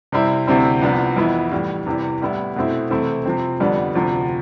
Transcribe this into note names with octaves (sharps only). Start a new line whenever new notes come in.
C3 G3 C4 E4
D2 C3 G3 C4 E4
C2 C3 F3 B3 D4
F2 E3 B3 E4
A2 E3 G3
E2 C3 E3 G3
A2 G3 B3 E4
B2 A3 C4 E4
C3 E3 A3 C4 E4
C3 F3 C4
F2 D3 G3 B3 D4
D2 C3 F3